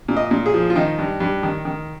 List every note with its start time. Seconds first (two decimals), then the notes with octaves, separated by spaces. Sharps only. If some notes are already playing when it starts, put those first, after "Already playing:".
0.08 A#2
0.17 D#5
0.31 A#2
0.46 G#4
0.54 F3
0.70 F4
0.75 D#3 D#4
0.99 G2
1.20 G2
1.43 D#3
1.65 D#3